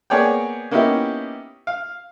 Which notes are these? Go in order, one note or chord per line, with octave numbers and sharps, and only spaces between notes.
A#3 B3 G#4 C#5 D5 G5
A#3 B3 C#4 D#4 E4 G4
F5